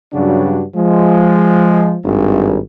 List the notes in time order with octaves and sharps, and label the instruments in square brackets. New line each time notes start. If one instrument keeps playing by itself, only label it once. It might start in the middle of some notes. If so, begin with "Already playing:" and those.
[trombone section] G2 C#3 F#3 D4 F#4
F3 G#3
G#1 G2